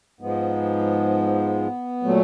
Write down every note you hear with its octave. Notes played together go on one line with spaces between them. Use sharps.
G#2 F3 G#3 B3
A#2 F#3 A3